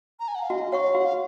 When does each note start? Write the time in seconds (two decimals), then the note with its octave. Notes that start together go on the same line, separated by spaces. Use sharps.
0.20 A#5
0.28 G#5
0.35 F#5
0.43 F5
0.50 F#4 D#5
0.72 C#5 F5 F#5 C#6
0.95 F#4 F#5
1.05 F5